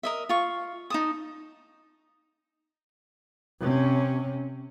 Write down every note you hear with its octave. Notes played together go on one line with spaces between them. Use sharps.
A#4 D#5 E5
F4 C#6
D#4 A5 D#6
C3 C#4